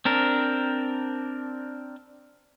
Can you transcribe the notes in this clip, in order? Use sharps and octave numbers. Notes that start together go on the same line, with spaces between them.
C4 D4 A#4